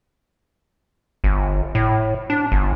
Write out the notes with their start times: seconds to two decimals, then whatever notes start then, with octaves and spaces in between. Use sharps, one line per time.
1.24 G1
1.75 A2
2.30 D4
2.52 G1